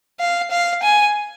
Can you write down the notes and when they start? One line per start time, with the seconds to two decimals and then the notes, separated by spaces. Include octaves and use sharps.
0.20 F5
0.51 F5
0.83 G#5